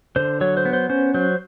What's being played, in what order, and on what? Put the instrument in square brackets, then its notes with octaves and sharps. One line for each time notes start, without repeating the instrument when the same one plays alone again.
[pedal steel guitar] D3 C5
F#3 C#5
C5
B3
C5
C#4 C5
F#3 C5